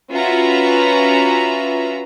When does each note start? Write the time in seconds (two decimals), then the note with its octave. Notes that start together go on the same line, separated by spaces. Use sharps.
0.11 C#4 F4 F#4 B4 E5 A#5